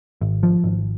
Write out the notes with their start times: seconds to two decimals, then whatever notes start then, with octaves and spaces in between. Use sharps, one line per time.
0.21 G#1
0.43 F3
0.64 G#1